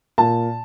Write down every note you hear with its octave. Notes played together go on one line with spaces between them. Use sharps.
A#2 A5